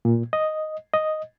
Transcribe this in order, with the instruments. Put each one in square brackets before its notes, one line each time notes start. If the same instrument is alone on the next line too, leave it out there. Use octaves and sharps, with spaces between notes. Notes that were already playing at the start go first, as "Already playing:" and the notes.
[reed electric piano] A#2
D#5
D#5